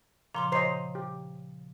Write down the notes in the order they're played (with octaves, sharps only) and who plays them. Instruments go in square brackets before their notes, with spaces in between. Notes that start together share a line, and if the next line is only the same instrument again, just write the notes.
[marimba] A#2 C#3 F3 [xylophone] A#5 C6 D6
[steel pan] C5 C#5 D#5 [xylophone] A#5 C7
[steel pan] G4